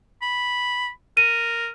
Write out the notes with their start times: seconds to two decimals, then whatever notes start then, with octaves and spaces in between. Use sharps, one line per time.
0.22 B5
1.17 A#4 D#7